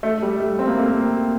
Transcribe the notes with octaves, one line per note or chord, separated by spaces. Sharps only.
A3
G3
A3
C4
A#3
A3
A#3